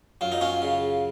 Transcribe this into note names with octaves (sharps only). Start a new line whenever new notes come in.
F#2 F4
D#4
C#4 F4
C#3